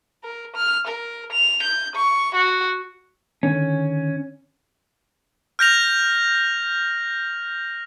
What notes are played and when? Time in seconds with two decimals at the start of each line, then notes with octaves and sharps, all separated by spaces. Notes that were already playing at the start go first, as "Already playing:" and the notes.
0.24 A#4
0.56 F6
0.87 A#4
1.32 F7
1.63 G6
1.95 C#6
2.35 F#4
3.43 D3 D#3 C#4
5.59 F6 G6 A#6 F7